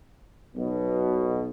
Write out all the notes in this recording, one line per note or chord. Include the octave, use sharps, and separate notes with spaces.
B1 B2